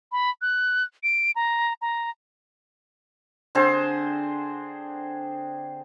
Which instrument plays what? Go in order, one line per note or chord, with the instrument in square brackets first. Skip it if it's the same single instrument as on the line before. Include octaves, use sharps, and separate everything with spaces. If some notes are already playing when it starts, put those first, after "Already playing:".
[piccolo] B5
F#6
D7
A#5
A#5
[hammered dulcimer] D3 C4 G#4 C5